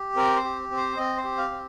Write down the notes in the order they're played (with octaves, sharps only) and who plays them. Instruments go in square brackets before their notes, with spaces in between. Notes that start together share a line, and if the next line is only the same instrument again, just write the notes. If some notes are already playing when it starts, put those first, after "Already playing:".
Already playing: [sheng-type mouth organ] G4
C4 A#4
C5
G4
C4
C5
C4 D#5
C5
G4
F5
C4